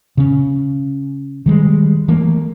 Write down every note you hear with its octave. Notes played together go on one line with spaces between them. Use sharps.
C#3 C#4
D#3 G3 G#3
E3 A3 A#3